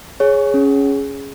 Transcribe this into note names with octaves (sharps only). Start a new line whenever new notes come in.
G#4 C#5
C#4